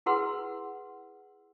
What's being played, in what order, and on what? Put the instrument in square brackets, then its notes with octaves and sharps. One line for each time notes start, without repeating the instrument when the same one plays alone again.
[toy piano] E4 G#4 B4 F#5 C6 E6